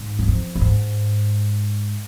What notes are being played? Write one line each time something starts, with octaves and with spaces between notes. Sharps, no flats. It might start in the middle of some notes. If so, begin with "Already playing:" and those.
Already playing: G#2
F#2
F2
A2
G#2